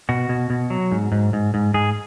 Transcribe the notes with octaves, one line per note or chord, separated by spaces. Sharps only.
B2 F#4
B2
B2
F#3
G#2
G#2
G#2
G#2
G#2 G#4